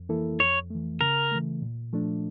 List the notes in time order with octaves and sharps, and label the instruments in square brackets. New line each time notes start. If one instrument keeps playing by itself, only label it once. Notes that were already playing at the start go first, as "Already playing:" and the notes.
Already playing: [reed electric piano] F2
E3 A#3 E4 A4
[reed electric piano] F2 [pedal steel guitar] C#5
[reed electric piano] E3 A3
[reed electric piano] C#3 [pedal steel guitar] A#4
[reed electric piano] E3 A3
A#2
F3 A3 D4